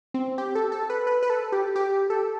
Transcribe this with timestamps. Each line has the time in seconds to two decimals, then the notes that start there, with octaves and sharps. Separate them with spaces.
0.14 C4
0.38 G4
0.55 A4
0.72 A4
0.90 B4
1.07 B4
1.23 B4
1.30 A4
1.52 G4
1.76 G4
2.10 A4